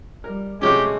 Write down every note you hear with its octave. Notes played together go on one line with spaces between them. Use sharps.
G3 A#4
C3 F#3 G#3 A3 C#4 G4